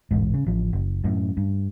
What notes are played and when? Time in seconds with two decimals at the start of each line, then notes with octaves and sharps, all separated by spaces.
0.11 E1 A1 G#2
0.34 C#3
0.46 A1 F3
0.73 F#1
1.04 F#2 A2
1.37 G2